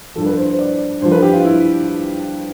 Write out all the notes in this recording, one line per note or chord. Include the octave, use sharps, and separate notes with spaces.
G2 F3 A4
B4
C5
C5
D5
G2 F3 C5
B4
G4
F4
E4